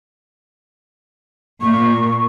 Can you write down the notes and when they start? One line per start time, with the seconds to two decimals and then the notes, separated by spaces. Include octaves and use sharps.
1.61 A#2 C#6